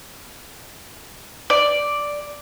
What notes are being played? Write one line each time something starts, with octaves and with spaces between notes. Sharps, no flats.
D5